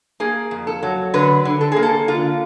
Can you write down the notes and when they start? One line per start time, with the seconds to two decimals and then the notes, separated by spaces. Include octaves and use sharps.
0.20 A#3 G#4
0.51 F2
0.67 A4
0.83 F#3
1.14 D3 B4
1.45 D3
1.61 A4
1.72 A#3 G#4
1.83 A4
2.08 D3 F4